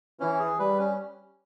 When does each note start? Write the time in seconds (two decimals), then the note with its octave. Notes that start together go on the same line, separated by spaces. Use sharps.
0.20 E3 C#4
0.39 G#4
0.59 G3 B4
0.78 C#4